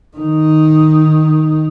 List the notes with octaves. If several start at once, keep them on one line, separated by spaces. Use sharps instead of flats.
D#3 D#4